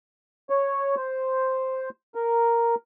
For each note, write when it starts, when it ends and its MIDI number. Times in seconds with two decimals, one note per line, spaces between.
0.50 0.95 73
0.96 1.89 72
2.15 2.75 70